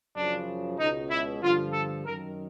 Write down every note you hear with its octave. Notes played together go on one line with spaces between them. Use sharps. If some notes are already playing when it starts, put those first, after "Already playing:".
F#2 C#3 F3 D4
C#2 B2 D#4
E4
G2 D3 F3 F4
A4
F#2 D#3 A#4